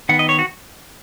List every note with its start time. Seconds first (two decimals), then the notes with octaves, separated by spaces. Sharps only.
0.09 D#3 B3 F#5
0.19 D#5
0.29 C#5
0.39 F#4